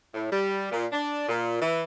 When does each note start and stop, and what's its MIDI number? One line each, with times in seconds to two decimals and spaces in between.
0.14 0.30 45
0.32 0.67 55
0.71 0.86 46
0.92 1.28 62
1.28 1.58 46
1.62 1.84 52